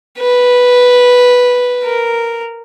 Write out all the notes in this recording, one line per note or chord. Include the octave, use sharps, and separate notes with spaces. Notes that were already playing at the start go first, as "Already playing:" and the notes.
B4
A#4